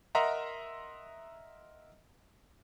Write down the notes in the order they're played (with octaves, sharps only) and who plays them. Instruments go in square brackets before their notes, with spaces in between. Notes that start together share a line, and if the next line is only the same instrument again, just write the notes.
[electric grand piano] A#4 D#5 E5 F#5 A#5 C6